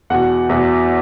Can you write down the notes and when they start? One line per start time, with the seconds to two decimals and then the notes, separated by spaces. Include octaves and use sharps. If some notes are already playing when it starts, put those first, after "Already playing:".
0.10 E2 B2 F#5
0.49 E2 B2